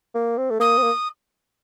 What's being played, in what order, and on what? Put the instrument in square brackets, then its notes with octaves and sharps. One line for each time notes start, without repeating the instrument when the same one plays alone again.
[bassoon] A#3
C4
A3
[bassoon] A#3 [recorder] D#6
[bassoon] C4
A#3